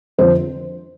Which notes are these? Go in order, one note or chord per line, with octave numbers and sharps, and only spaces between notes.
F2 D3 F3 C5